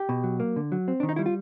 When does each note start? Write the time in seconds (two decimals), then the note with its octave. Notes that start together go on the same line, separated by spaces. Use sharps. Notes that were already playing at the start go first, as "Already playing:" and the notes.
Already playing: G4
0.09 B2
0.24 F#3
0.40 A#3
0.56 D3
0.72 F#3
0.88 C4
1.00 D#3 D4
1.09 D#4
1.16 G3 E4
1.26 F4